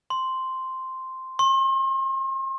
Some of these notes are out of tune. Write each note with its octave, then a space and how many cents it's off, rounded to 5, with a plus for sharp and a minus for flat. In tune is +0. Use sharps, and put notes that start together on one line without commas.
C6 -5
C6 +40